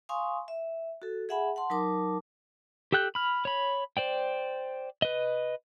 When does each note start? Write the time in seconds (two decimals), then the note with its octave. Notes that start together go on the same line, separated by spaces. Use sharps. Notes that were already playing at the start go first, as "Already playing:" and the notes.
0.09 F5 G#5 C6 C#6 D#6
0.48 E5
1.02 F#4 A4
1.29 G#4 E5 F#5 G#5 B5
1.56 F#5 A5 C6
1.70 F#3 D#4 A#4 A5 D6
2.92 G4 A4 G5 F#6 G6
3.15 B5 F6
3.45 C#5 B5
3.97 C5 D5 G5
5.02 B4 D#5